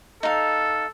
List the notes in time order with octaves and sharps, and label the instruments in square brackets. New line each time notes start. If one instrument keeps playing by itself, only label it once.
[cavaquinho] D#4 F5 [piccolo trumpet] A4